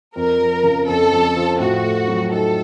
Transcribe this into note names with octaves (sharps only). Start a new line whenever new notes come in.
F2 A#4
F3
C#3
F2 A4
F2
F3
A2 F#4
A3
F#3
D#4 A4